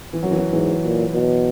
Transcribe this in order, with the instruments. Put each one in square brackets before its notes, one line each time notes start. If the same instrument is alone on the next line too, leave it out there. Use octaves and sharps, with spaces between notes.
[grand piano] E3
[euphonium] F#2 [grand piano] F#3
[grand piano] E3
F#3
[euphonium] G#2 [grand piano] E3
[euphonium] A#2
B2